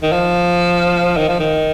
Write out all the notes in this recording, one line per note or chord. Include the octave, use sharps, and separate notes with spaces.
D#3
F3
D#3
F3
D#3